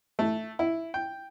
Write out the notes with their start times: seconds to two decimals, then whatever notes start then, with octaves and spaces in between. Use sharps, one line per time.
0.19 A3
0.59 E4
0.94 G5